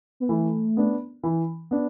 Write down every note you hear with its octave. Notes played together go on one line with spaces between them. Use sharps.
B3
E3 A3
B3 D4
E3
B3 D4